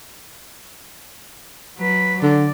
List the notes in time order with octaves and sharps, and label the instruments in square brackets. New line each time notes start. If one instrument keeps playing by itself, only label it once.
[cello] F#3 B4
[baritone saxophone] D3 [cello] D5